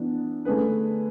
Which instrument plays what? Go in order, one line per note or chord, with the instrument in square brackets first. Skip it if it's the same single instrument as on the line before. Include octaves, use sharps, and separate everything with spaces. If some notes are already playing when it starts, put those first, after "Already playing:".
Already playing: [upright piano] E3 B3 D4
D3 A3 D4 G#4 B4